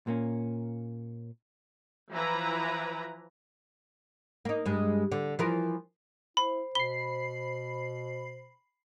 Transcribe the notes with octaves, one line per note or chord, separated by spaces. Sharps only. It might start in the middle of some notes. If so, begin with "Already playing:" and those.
A#2 A#3 C#4
E3 F3 E4 B4 A#5
A#3 D#4
G2 G#3
D3
E3 F3 A#4
E4 C5 B5
B2 B5 C7 G7